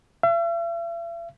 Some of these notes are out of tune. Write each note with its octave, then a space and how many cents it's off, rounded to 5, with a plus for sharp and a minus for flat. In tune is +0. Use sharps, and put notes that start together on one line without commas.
E5 +45